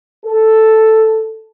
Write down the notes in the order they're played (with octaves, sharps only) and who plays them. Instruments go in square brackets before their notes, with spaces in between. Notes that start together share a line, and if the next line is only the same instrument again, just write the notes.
[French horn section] A4